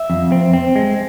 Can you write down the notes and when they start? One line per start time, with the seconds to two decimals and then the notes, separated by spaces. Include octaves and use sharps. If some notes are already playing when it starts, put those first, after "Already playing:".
Already playing: E5
0.10 F2
0.32 C4
0.53 C4
0.76 G#3